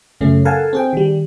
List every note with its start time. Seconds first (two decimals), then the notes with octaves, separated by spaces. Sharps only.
0.21 F#2 C#3 A3 C#4
0.45 A4 A#4 F5 F#5 G#5 A5
0.73 C4 G#4 G5
0.93 D#3 G3